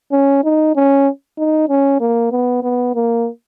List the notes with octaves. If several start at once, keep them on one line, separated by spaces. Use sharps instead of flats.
C#4
D#4
C#4
D#4
C#4
A#3
B3
B3
A#3